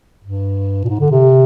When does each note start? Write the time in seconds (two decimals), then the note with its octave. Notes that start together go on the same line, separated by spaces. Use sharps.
0.24 G2
0.84 A#2
0.89 G#2
1.00 D3
1.11 C3